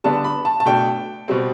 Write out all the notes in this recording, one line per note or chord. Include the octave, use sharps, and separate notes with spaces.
D3 G3 B3 D4 A5
B5
A5
A5
B2 A3 D4 G5
B2 G3 C4